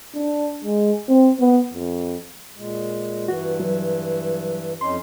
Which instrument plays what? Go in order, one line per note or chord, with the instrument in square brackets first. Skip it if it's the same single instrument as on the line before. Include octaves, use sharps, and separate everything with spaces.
[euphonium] D4
G#3
C4
B3
F2
[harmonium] A#2 G#3
[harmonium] G2 E3 [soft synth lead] F#4
[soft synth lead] F#3
[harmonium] F2 C#4 D#4 [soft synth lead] C6